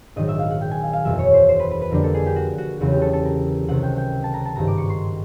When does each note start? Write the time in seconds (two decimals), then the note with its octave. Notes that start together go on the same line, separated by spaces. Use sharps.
0.16 A#1 G#2 D#3 F#3 D#5
0.28 E5
0.39 F5
0.50 F#5
0.61 G5
0.71 G#5
0.83 F5
0.93 F5
1.04 F#1 E2 B2 F#3 E5
1.19 C#5
1.34 C5
1.49 C5
1.59 B4
1.71 B4
1.81 B4
1.91 F2 D3 G3 A#3 D4 A#4
2.04 A4
2.14 G#4
2.26 G4
2.36 F#4
2.58 F#4
2.80 E1 E2 C#3 F#3 B3 F#4
2.92 G4
3.02 A4
3.13 A4
3.25 A#4
3.68 C#2 C3 D#3 F#5
3.83 G5
3.97 G5
4.24 A5
4.34 A#5
4.45 A5
4.55 G#1 G2 D#3 A#5
4.68 D6
4.78 C#6
4.90 C6